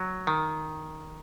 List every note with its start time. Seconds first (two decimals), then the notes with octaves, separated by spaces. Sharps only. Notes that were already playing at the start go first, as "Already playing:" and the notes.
Already playing: F#3
0.27 D#3